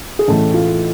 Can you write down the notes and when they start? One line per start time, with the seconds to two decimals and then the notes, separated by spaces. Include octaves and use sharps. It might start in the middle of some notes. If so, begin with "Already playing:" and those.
0.19 G#4
0.28 A1 A2 E3 A4
0.54 F4